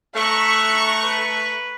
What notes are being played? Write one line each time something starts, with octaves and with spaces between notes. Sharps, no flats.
A3 E5 A#5 C#6 F#6
B4